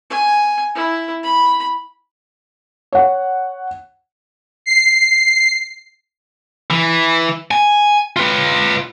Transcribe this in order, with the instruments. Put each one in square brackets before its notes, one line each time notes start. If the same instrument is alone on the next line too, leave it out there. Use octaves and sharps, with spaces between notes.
[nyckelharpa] G#5
E4
B5
[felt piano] C#5 F#5
[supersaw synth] C7
[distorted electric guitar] E3
G#5
F4 B4